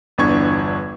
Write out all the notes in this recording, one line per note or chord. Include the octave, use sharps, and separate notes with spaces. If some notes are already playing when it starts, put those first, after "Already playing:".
G1 E2 D4 C#6 G#6